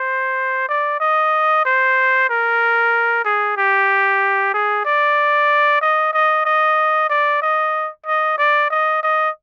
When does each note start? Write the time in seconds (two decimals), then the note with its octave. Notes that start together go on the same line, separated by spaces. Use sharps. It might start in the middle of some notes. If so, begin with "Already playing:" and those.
Already playing: C5
0.68 D5
1.00 D#5
1.65 C5
2.29 A#4
3.25 G#4
3.57 G4
4.54 G#4
4.85 D5
5.81 D#5
6.13 D#5
6.45 D#5
7.09 D5
7.41 D#5
8.06 D#5
8.38 D5
8.70 D#5
9.03 D#5